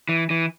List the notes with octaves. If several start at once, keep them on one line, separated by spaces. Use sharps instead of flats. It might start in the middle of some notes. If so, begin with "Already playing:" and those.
E3
E3